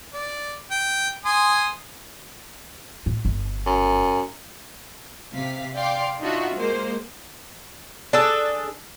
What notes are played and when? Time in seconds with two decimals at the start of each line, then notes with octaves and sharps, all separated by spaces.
0.14 D5
0.71 G5
1.25 G#5 C6 D#6
3.06 A2
3.25 G1
3.66 F#2
5.34 C3 F5 B6
5.76 D5 F5 G5 C6 D6
6.21 D4 D#4 F4 F#4 E5
6.55 G#3 A#3 C5
8.13 D4 G#4 A4